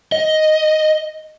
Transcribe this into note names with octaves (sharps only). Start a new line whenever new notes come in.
D#5